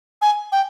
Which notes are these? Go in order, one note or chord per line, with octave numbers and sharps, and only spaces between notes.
G#5
G5